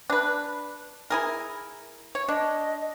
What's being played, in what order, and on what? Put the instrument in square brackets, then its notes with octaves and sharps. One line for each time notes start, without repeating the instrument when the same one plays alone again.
[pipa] D4 B4
E4 G#4 A#4
C#5
[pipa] D4 [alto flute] D#5